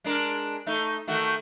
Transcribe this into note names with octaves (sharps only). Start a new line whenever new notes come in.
G#3 D4 A#4
A3 D#4
D#3 A3 F#4